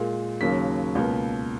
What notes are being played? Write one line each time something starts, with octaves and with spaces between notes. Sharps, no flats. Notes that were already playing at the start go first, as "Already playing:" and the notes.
Already playing: A#2 G#3
D#2 C#3 F#3 A#3 B6
C#2 B2 A#3